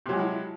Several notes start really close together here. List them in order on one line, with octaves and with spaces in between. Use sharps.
C3 F#3 G#3 F3 E4